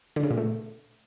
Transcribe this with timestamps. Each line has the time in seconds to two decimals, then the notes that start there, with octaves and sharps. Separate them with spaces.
0.16 D3
0.23 C#3
0.30 A#2
0.38 A3